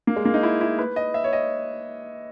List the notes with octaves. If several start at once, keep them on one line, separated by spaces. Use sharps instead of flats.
A#3
G#3
A#3
D#4
E4
E4
B4
D#5
E5
C#5
D#5